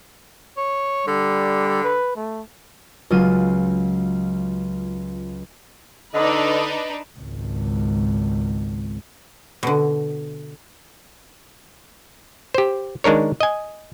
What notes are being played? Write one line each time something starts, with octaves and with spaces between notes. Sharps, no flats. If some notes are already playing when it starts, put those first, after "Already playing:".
C#5
D3 G3
B4
A3
C#2 F#3 F4 D#7
D3 D4 D#4 B4 D#5
G#1 C#2
B2 D3
G4 C5
D#3 G#3 D4 A#4 C#5
D#5 G#5